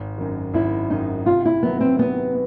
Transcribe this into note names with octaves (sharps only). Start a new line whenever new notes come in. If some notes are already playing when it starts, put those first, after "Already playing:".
Already playing: G#1
F#2 D#3
G#1 E4
F#2 D#3 D#4
C3 F4
E4
D#3 F#3 B3
C4
C3 B3